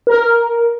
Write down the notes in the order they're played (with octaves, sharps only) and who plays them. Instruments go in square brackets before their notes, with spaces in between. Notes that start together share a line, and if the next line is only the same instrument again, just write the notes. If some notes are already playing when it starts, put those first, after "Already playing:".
[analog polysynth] A#4